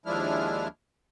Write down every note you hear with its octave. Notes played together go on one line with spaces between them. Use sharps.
D#2 F3 G#3 D4 E4 F6